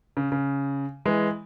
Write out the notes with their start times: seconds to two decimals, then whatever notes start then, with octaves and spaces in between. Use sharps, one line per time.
0.17 C#3
0.32 C#3
1.05 E3 G#3